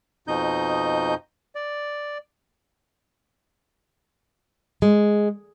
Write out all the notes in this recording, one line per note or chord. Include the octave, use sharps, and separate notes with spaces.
F2 B2 D#4 D#5 G6
D5
G#3